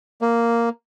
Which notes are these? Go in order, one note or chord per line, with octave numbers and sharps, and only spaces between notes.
A#3